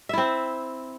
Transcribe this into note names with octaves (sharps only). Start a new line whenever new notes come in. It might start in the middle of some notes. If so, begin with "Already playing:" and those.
C4 E4 E5